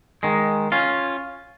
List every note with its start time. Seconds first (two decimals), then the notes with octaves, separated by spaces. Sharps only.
0.23 D#3 G#3
0.72 C#4 F4